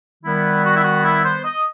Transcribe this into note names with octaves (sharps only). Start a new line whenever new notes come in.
D#3 G3 B3 E4
F#4
E4
F#4
E4
C5
D#5